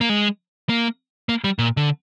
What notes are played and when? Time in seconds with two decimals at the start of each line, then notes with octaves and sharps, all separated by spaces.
0.01 A#3
0.09 G#3
0.69 A#3
1.29 A#3
1.44 G3
1.59 A#2
1.77 D3